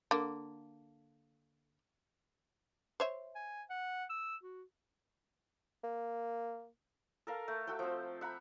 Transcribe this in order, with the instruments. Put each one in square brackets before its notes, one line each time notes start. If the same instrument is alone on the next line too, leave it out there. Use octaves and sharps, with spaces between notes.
[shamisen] D3 A#3
C5 C#5 E5
[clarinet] G#5
F#5
E6
F#4
[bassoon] A#3
[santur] A4 A#4 F5
A3
F#4 A4 E5 G5
F3 C4
E5 F#5 A#5 B5